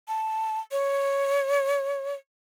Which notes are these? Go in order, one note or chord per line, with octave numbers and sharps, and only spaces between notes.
A5
C#5